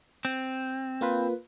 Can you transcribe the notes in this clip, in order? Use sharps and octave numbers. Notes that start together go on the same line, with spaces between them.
C4
A#3 F4 B4